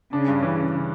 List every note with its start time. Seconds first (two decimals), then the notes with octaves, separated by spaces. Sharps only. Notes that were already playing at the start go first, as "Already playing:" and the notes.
0.13 C#3 D4
0.28 G2
0.43 E3